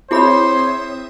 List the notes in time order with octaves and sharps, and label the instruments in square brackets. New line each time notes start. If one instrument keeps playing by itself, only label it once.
[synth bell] C4 E5 D#6 [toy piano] E4 G#4 B5 [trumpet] C5 [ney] C#5